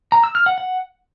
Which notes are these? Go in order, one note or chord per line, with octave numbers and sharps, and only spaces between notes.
A#5
E6
F6
F#5
F#5